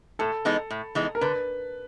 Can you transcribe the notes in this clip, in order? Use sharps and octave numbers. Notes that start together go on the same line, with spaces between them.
A2 A4
E3 G#3 B3 D#4
A2
E3 G#3 B3 D#4
A#4
D3 B4